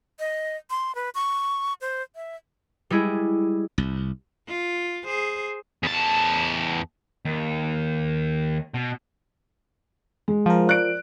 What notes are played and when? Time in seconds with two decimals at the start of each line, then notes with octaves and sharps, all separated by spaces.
0.19 D#5
0.70 C6
0.95 B4
1.15 C#6
1.81 C5
2.15 E5
2.90 G3 G#3 E4 G#4
3.78 C2
4.48 F4
5.05 G#4 C5
5.83 E2 A5
7.25 D#2
8.74 B2
10.28 G#3
10.46 F3 A#4
10.67 D5 F#6 D7